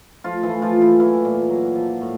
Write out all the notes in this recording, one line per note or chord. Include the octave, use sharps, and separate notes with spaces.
F3 A3 F4
E3 E4
A3
F3 F4
A#2
E3 E4
E3 F#3 E4
A#2
F#3
F3
A2